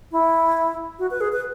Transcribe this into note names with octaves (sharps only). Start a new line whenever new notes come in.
E4
F#4
B4
G#4
B4